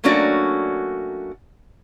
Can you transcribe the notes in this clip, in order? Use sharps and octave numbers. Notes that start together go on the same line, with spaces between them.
F#3 A3 A#3 C#4 D4 F#4